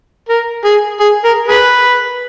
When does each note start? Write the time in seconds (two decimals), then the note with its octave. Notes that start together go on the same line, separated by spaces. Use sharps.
0.29 A#4
0.65 G#4
1.00 G#4
1.25 A#4
1.48 G#4 B4